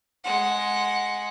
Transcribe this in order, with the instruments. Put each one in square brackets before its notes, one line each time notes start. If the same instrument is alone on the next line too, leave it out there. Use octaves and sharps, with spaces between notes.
[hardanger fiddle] G#3 F#5